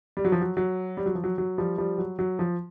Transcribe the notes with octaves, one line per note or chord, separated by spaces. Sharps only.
G3
F#3
F3
F#3
F#3
G3
F#3
F3
F#3
F#3
F3 G3
F3 G3
F#3
F#3
F3